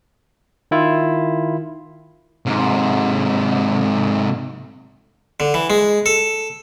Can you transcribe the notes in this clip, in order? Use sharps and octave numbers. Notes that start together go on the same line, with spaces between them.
D#3 E4 F4
G#2 C3
D3
E3
G#3
A4